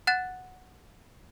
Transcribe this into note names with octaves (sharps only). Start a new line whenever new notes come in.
F#5 F#6 A6 E7